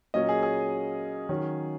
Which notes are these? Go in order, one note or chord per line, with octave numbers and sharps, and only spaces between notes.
A#2 F#3 A#3 C#4 D#5
G#4
G#4
D#3 F#3 C#4